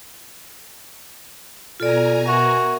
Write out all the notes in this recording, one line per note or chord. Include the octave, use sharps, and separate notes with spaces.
B2 F4 A4 D5 G#5 A#5
F#4 A#4 E5